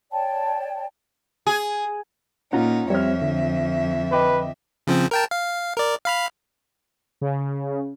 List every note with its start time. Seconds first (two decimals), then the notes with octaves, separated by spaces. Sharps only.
0.11 C#5 D5 G5 A5
1.47 G#4
2.53 A#2 C#4 D#4 F4 F#5 A#5
2.90 F2 G3 C4 C#5 E5 F6
3.22 D3
4.12 B4 D#5 G5 D6
4.87 C#3 F3 C4
5.11 A#4 G5 A5
5.31 F5
5.77 A#4 D5
6.05 F5 B5 F6
7.21 C#3